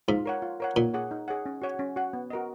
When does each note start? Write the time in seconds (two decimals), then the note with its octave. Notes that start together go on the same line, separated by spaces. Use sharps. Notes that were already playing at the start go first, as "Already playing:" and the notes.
0.08 G#2 F4
0.26 A#4 C#5 F#5
0.42 F4
0.60 A#4 C#5 F#5
0.76 A#2 D#4
0.94 G#4 C#5 F#5
1.11 D#4
1.28 G#4 C#5 F#5
1.46 C#4
1.62 F#4 C#5 F#5
1.79 C#4
1.96 F#4 C#5 F#5
2.13 B3
2.30 F#4 A#4 D#5